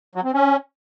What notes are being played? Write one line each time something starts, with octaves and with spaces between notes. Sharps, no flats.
F#3
C4
C#4